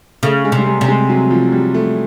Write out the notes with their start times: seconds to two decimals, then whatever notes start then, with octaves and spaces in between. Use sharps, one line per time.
0.23 C#3 A3
0.45 G#3
0.52 C3
0.58 G3
0.66 G#3
0.81 C3
0.88 G#3
1.09 F#3
1.31 F3
1.52 G3
1.74 A3